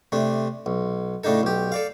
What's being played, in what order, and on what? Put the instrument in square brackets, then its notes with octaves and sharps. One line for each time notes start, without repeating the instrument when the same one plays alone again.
[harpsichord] C3 A3 D4
B1
A2 C#3 D4 D#4 A4
B1 G4
A4 D5 F5